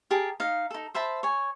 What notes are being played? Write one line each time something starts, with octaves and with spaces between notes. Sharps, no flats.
G4 G#4 A#4 A5
D#4 F5
D#4 A4
C5 E5 A5 B5
C#5 G#5